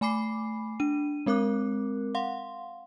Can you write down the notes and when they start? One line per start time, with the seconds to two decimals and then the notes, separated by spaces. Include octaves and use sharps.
0.01 A3 G#5 B5 D6 C7
0.80 D4 D#7
1.26 G#3 C4 A#4 D6 F#6
2.15 F5 F#5 C6